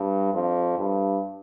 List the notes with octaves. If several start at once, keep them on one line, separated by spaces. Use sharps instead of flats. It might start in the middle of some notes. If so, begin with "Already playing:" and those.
Already playing: G2
F2
G2